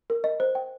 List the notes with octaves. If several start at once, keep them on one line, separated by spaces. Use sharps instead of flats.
A#4
D#5
C5
G5